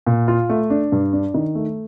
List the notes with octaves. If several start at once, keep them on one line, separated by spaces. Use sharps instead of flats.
A#2
F4
A3
D4
G2
D4
D#3
A3